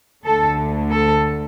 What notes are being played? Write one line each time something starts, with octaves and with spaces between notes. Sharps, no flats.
D2 D3 A4
A4